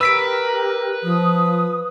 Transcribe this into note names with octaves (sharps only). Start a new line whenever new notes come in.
G4 A#4 B4 E6 B6 D7
F3 D#6